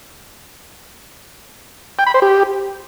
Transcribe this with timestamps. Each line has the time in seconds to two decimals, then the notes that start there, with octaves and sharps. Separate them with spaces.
1.99 G5
2.06 B5
2.14 C5
2.22 G4